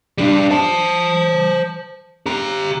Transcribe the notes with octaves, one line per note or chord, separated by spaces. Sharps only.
G3 D4
C5 A5
G4 A#5